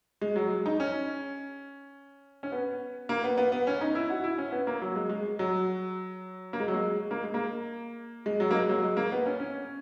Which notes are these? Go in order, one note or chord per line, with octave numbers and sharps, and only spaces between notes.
G#3
F#3
G#3
D#4
C#4
C#4
B3
A#3
B3
B3
B3
C#4
D#4
E4
F#4
E4
C#4
B3
A#3
F#3
G#3
G#3
F#3
A#3
G#3
F#3
G#3
A#3
G#3
A#3
G#3
F#3
A#3
G#3
F#3
G#3
A#3
B3
C#4
C#4